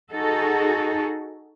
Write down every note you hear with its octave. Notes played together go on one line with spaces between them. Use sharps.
D#4 F#4 G#4 A4